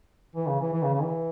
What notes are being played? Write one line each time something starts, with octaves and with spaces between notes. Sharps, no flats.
E3
C#3
E3
E3
C#3
C#3
E3